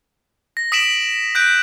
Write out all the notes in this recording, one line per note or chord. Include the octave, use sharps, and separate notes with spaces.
A#6
D#6 B6 D7 E7 F#7
F#6 G6 B6 D7